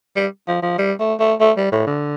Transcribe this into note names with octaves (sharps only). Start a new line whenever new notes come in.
G3
F3
F3
G3
A3
A3
A3
G3
A2
D3